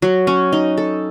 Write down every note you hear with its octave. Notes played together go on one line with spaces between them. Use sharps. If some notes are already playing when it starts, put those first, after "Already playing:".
F#3
C#4
D#4
A4